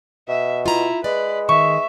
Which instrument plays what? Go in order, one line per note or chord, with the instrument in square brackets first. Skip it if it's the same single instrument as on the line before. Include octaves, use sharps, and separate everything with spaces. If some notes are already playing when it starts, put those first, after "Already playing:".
[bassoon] B2 [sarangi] E5
[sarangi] E4 [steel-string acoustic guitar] F4 A#5
[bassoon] G#3 [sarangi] B4 [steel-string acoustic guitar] D5
[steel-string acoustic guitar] D#3 [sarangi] E5 [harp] C#6